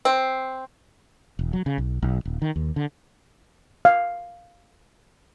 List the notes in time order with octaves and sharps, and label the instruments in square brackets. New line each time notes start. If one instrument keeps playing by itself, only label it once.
[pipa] C4
[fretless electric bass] E1
F#3
C#3
B1
B1
D#1
D#3
D#2
D3
[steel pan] F5